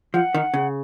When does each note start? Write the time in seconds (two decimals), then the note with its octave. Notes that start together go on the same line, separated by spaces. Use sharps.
0.14 F3 F#5
0.34 D#3
0.54 C#3